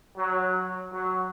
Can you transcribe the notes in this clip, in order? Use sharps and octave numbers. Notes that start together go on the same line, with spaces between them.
F#3
F#3